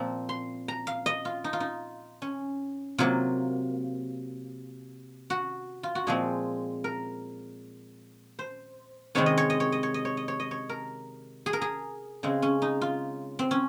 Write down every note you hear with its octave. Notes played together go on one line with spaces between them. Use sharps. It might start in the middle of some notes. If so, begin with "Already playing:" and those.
Already playing: A#2 F3 C4 A#5
C6
A#5
F5
D#5
F4
D#4
F4
D#4
C#4
C3 F#3 A#3 F4
F#4
F4
F#4
A#2 F3 G#3 C4 G#4
A#4
C5
C3 D#3 G#3 C4 C#5
D#5
C#5
D#5
C#5
D#5
C#5
D#5
C#5
D#5
C#5
D#5
C#5
A#4
G#4
A#4
G#4
C#3 G#3 C4
C#4
D#4
F4
C4
C#4